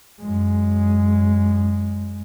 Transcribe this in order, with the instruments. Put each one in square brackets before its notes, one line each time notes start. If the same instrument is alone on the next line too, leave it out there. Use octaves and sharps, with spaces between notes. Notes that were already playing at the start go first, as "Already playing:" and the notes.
[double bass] F#2 G#3